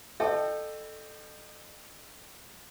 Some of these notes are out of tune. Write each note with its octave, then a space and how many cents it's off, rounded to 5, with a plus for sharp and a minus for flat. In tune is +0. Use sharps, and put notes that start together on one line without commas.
A4 +0 D#5 -40 G5 +0